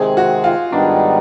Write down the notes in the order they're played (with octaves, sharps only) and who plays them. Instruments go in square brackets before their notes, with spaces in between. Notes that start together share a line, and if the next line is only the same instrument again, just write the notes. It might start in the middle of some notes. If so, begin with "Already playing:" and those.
Already playing: [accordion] C3 D#3 G#3 C4 [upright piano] G#4
[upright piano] F#4
F4
[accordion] G#2 D#3 G3 B3 D#4 [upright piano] D4